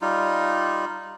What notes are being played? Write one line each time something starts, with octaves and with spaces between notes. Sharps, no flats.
G3 D#4 F4